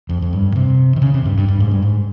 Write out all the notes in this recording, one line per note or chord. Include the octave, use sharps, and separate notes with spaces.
F2
F2
G2
C3
D#3
C#3
C3
G2
G2
G2
G#2
G2
G#2